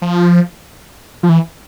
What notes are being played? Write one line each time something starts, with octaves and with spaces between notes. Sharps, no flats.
F3
F3
E3